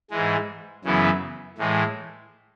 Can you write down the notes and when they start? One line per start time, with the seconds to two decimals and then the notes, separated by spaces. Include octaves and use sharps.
0.11 G#2 E3 G#3
0.85 F#2 C#3 E3 B3 E4
1.58 A2 E3 G#3